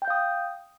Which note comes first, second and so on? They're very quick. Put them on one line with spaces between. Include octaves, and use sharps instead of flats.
G5 G6 F5 D#6